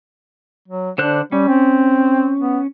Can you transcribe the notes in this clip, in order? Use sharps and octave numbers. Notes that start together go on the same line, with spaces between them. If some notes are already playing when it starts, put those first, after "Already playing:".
F#3
D3 D4 C5 F#6
G3 C#4
C4
B3